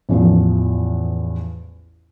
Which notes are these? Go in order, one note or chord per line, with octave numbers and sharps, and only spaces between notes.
A1 E2 F3